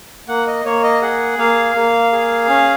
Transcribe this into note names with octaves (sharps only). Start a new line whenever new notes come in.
A#3 F#5
D#5
A#3 C#5
D#5
G#4 F#5
A#3 F5
A#3
G#4
C#4